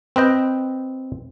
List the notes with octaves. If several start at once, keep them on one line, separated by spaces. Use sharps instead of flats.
C4 B4 D#5 G5